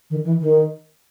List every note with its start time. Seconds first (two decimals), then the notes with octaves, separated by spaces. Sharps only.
0.10 D#3
0.25 E3
0.41 D#3